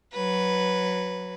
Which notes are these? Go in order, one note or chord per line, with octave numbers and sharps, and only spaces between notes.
F#3 B4